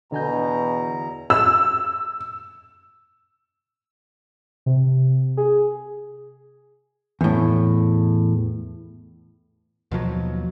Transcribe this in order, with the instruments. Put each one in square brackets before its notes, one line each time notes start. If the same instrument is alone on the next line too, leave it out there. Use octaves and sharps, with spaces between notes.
[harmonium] E2 A#5 [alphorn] B2 [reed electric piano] D3 G#5 G6
[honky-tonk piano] E6
[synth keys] C3
G#4
[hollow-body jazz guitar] E2 A2
[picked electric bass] D#2 B2 F3 F#3